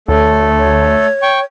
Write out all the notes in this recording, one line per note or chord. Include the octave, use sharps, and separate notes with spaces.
D2 A3 A4 C#5
C#5
G5 C#6